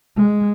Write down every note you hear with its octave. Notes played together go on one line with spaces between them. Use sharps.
G#3